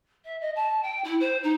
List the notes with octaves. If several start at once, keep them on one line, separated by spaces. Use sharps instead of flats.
E5
D#5
A5
G5
E4
C5
D#4